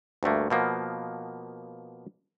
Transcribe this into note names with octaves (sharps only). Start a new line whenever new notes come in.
D2 G2 A3 A#3
B2 F3 A#3 B3